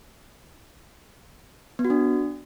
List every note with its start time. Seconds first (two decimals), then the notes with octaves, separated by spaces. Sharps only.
1.79 B3
1.85 F#4
1.90 D4